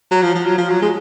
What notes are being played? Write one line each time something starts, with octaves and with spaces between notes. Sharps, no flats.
F#3
F3
F3
F#3
F3
F#3
G#3